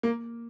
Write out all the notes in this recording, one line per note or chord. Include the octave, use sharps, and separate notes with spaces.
A#3